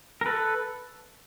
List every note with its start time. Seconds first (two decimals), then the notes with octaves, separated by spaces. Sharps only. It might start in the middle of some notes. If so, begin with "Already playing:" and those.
0.21 A#4
0.26 A4 B4